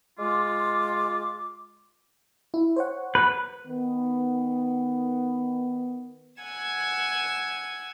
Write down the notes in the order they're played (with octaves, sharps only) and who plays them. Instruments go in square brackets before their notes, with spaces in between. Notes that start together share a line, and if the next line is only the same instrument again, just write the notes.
[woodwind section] G#3 F4 D6
[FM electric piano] E4
C5 C#5 F#5
[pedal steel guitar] B4
[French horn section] D#3 B3
[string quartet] F#5 G#5 E6 G#6